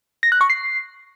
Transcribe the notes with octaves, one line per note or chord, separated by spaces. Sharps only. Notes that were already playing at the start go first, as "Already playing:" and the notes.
A#6
F#6
C#6
C7